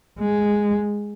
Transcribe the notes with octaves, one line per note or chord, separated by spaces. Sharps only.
G#3